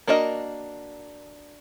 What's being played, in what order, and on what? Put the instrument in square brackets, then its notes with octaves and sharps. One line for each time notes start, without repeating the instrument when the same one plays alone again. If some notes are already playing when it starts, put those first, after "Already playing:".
[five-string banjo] A#3 D4 F#4 A#4 D#5